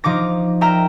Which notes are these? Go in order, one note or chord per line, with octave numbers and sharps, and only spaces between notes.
F3 D#4 D6 A#6
A#4 E5 G5 A#5